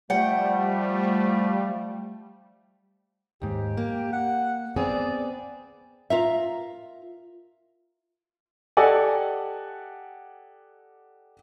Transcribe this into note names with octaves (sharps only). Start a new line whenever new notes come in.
F3 G3 A3 F#5 G5
D#2 G#2 G4
A#3
F#5
B3 C4 G#4 D5
F4 A#4 E5
G4 A4 D5 D#5 F#5 G#5